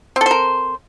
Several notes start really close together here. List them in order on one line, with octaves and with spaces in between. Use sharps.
C4 A4 C5 A#4